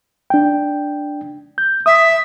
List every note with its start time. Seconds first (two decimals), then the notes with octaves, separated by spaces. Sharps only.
0.30 D4 G5
1.58 G6
1.86 E5 D#6